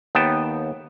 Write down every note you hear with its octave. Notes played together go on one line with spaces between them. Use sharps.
D#2 B3 G5 A5